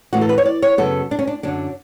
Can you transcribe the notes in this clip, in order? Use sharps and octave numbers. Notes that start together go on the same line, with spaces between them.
A2 E3 A3 F#4
A4
B4
C#5
D5
C#5
F#2 C#3 F#3 B3 A4
D4
C#4
D4
F#2 D3 F#3 D4